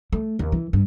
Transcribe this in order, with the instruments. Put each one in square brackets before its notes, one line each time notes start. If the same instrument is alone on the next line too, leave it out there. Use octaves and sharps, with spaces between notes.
[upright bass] A3
D#2
E3
G2